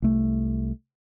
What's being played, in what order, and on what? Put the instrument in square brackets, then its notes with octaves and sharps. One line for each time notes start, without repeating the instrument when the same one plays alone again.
[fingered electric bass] C2 A3